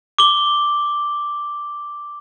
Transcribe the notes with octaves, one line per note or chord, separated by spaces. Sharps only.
D6 G7